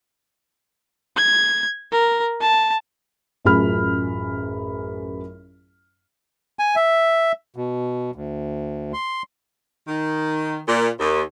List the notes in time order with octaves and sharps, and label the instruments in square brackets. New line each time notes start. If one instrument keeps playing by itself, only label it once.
[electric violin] G#6
A#4
A5
[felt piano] A1 F#2 F4 G#4 B5 F6
[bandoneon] G#5
E5
B2
D2
C6
[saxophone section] D#3
A#2
D#2